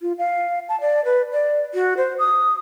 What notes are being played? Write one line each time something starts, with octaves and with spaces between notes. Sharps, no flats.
F4
F5
A5
D5
B4
D5
F#4
C5
D#6